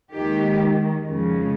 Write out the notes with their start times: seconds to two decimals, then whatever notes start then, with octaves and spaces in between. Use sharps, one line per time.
0.11 D#2 D#3 G#3 G4
1.07 F2 C#3 F3 G#3